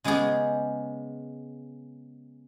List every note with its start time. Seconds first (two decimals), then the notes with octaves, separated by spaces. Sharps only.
0.04 C#3 G#3 B3 G4 G#4 C#5